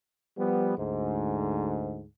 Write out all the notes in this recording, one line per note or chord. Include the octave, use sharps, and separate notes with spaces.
F3 G3 B3
D2 G#2